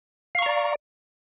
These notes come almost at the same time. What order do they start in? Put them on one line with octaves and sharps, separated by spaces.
F5 C#6 A#5 D5